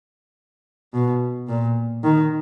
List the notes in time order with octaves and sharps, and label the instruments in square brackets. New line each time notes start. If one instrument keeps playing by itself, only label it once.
[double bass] B2
A#2
D#3